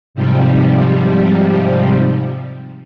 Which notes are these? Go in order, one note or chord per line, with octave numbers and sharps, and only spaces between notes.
G#2 C3 F3 G3